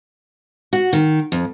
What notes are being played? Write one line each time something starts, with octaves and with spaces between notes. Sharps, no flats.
F#4
D#3
F2